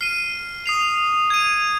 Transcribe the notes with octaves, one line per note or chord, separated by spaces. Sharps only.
F6 C7 D#7
D#6 C7 F7
G#6 D#7